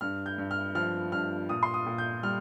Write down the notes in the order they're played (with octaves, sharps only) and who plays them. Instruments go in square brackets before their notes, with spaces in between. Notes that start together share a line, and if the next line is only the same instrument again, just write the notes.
[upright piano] G2 F6
G6
G2
F6
F3 F6
G2 F6
A#2 D#6
C6
D#6
A#2
G6
G3 F6